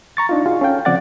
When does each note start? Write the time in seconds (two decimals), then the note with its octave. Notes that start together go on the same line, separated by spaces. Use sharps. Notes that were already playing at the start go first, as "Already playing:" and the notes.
0.17 A#5 C#6 A6
0.29 D4 D#4 F4
0.45 C2 F4 F#4 G#4
0.61 C#4 A4 F5 G5
0.85 C#3 F3 C4 D5 F#5 A6